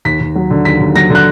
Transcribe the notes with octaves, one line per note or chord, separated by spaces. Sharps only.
D#2 B6
D#2
F#3
D3
D#2 B6
D#2
F#3 A#6
D3 F#6